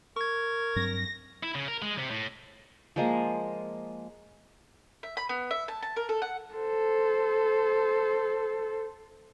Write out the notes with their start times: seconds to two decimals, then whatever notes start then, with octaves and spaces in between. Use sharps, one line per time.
0.16 A#4 C#6 G#6
0.76 G2 F#3 C4 A#6
1.43 E4
1.55 C#3
1.68 A#4
1.82 G#3
1.98 C3
2.11 A2
2.96 F3 G#3 A#3
5.03 E5
5.17 B5
5.29 B3
5.51 E5
5.68 A5
5.83 A5
5.96 A#4
6.09 A4
6.22 F#5
6.55 A4 C5